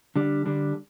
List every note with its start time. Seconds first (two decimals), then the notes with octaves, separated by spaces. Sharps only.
0.16 D3 G3 D4
0.46 D3 G3 D4